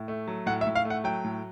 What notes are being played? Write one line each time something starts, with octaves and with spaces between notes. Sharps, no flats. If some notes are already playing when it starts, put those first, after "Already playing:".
Already playing: A2
A3
F#3
A2 F#5
E5
A2
F5
A3
F#5
F#3 G5
A2